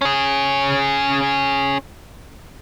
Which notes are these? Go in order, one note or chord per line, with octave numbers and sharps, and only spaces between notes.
C#4 G#4